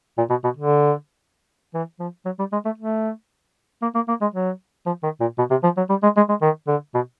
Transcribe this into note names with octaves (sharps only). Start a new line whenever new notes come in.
A#2
B2
B2
D3
E3
F3
F#3
G3
G#3
A3
A3
A#3
A#3
A#3
G#3
F#3
F3
D#3
A#2
B2
C3
F3
F#3
G3
G#3
G#3
G#3
D#3
D3
B2